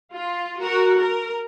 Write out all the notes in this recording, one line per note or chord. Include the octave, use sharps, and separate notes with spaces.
F4
F#4 A#4
A#4